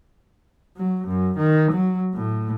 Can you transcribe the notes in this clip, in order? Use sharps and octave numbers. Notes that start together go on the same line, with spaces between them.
F#3
F#2
D#3
F#3
A2